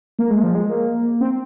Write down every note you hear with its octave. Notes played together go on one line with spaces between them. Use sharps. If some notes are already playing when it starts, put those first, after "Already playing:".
A#3
G#3
F3
G#3
A#3
C4